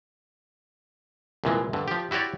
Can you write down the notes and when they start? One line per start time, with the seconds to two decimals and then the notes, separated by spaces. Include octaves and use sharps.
1.44 C2 A#2 E3 G#3
1.73 G2 D3
1.88 F3 G4
2.11 E4 F#4 G4 C#5 D5